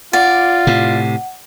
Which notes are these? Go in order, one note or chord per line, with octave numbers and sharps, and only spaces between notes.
F4 D5 F#5
A2 C3